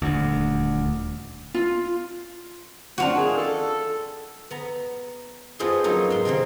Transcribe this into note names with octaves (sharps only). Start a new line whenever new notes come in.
D#1 D2
F4
C4 D4 F4 F#4
D#3 G#4
A4
B3 A#5
F2 F3 B3 G#4 D#5 C6
F#3 A#3 B3 C#4 D#4 F4
G#2 C6
C3 D#3 A#3 C4